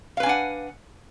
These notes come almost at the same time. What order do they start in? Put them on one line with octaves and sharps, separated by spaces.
F5 B4 G#5 D4 F#5